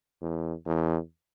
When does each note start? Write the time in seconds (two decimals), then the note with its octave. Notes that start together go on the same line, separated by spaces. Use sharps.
0.22 E2
0.66 E2